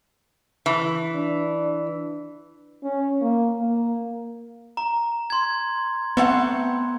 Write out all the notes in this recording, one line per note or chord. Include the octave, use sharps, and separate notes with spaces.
E3
D4
C#4
A#3
A#3
A#5
C6 G#6
A3 B3 C4 F#5